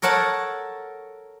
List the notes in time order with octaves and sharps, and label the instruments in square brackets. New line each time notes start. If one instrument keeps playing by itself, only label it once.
[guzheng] A4 A#4 C#5 F#5 A5